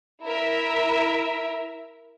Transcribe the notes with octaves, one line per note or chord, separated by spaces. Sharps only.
E4 A#4 E5